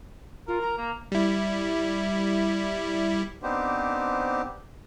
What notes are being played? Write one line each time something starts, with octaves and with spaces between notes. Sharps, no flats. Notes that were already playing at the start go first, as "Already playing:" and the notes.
F4 A#4
A#5
A#3
G3 E4
B3 C4 D4 D#4 G4 C5